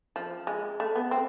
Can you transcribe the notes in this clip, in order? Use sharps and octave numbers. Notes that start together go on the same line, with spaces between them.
F3
G#3
A3
B3
C4